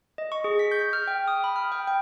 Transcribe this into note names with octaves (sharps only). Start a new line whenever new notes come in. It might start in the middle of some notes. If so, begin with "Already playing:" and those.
D#5
C#6
G#4
B6
G6
F6
G5
D#6
B5
F6
G5
G5